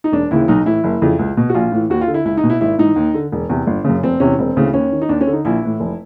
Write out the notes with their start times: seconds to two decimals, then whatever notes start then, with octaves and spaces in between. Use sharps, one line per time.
0.04 D#4
0.12 E1 D4
0.31 D#2 C#3 E3 E4
0.48 B1 D#4
0.66 A2 E3 E4
0.84 F#1
1.01 F2 C#3 E3
1.19 C#2
1.37 B2
1.50 F#4
1.55 A#1 F4
1.72 A2 E3
1.90 D#2 F#4
2.01 F4
2.08 D3
2.14 E4
2.25 C#2 E4
2.37 D#4
2.44 B2
2.50 E4
2.61 G#1 E4
2.78 G#2 E3 D#4
2.96 D#2
3.14 D3
3.32 E1
3.49 E2 C3
3.67 G1
3.85 F#2 C#3
4.03 F1 C4
4.20 E2 C3 E3 C#4
4.39 E1 C4
4.56 D2 C#3 E3
4.73 D#2 C#4
4.92 D#3
5.02 D#4
5.09 D#2 D4
5.21 C#4
5.27 D3
5.33 D#4
5.45 A#1 E4
5.63 A2 E3
5.80 F1